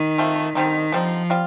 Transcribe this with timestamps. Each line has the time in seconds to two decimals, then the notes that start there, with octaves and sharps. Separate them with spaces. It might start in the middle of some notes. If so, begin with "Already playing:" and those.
Already playing: D#3
0.18 F3 A3 C4
0.55 D3 D#3 G3 C4 D#4
0.92 D3 F3 G3 C4 D#4
1.30 G3 C4 F4